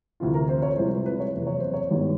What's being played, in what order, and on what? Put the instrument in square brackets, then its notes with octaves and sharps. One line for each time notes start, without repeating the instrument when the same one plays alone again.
[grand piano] D2 C3 E3 F4
A#4
C5
C#5
C2 C3 F3 G#3 C5
B4
B4
C#5
F#1 E2 C3
C#5
C5
C#5
G#1 G2 D#3 G3 B3